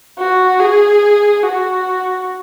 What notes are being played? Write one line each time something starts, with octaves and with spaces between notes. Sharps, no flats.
F#4
G#4
F#4